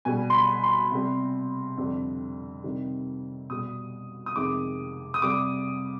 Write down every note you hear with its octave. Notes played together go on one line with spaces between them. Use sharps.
B2 G3 G#5
C6
B5
C6
C3 G3
F2 D3 G3
C3 D#3 G3
B2 G3 D#6
D#6
F2 C3 D#3 G#3 D6
D#6
C3 G3 D6